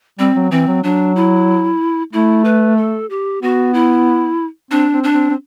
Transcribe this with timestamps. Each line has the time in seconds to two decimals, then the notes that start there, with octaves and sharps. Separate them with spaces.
0.19 G3 C4
0.36 F#3
0.51 E3 C4
0.68 F#3
0.84 F#3 D4
1.16 E4
2.13 A3 E4
2.45 B4
2.77 A4
3.10 G4
3.42 B3 F#4
3.74 E4
4.71 C4 D4
4.92 C4
5.04 D4
5.14 C4
5.30 C4